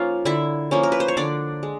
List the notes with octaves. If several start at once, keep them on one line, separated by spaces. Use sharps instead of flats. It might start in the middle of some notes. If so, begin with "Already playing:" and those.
Already playing: F3 A#3 C#4 D#4 F4 F5
D3 E4 E5
F3 A#3 C#4
A#4
B4
C5
C#5
D3 D4 D5
G#3